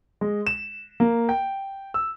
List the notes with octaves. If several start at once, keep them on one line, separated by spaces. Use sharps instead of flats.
G#3
E7
A#3
G5
E6